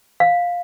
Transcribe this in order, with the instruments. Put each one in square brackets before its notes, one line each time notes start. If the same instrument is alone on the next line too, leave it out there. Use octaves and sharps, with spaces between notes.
[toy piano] F5